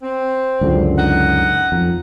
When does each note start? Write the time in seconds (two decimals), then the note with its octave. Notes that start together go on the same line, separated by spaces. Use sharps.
0.02 C4
0.61 C#2 F#2 D3
0.97 D#4 F#5
1.72 F2